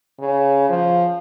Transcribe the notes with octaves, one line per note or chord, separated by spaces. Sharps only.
C#3
F3